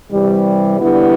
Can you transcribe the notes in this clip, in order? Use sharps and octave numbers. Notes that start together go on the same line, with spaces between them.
C3 E3 G3
D3 G3 B3 E4